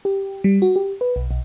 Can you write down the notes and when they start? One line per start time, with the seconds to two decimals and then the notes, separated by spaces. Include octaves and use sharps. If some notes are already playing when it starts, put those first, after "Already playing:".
0.05 G4
0.44 G3
0.62 F#4
0.76 G4
1.01 B4
1.16 B1
1.31 B1